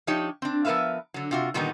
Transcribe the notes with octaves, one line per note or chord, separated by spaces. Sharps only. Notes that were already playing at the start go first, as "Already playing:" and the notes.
F3 D4 D#4 G4 C#5
C4 D4
F3 B3 A#4 B4 E5 F5
D3 F#3
C3 F4 F#4
A#2 D3 D#3 G3 B3 D#4